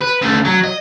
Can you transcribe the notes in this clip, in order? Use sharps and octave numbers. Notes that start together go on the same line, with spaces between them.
B4
C#3 A3
F#3
D#5